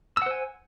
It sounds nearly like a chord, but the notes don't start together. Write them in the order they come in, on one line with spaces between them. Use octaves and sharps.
E6 F#5 C5 G#5